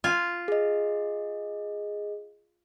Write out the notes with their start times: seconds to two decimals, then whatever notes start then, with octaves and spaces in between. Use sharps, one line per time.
0.04 F4 G#5
0.48 G#4 D#5